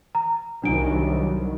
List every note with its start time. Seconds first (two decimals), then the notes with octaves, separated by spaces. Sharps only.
0.15 A#5
0.64 C2 D#3 F#3 D4 D7